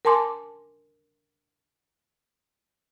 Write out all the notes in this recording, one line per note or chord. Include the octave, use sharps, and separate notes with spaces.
A#4 G#5 A5 C6 D6